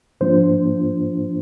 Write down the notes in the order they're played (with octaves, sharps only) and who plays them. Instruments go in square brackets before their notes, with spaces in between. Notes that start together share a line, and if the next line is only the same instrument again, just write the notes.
[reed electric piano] G#2 F3 A#3 D4 F4 C5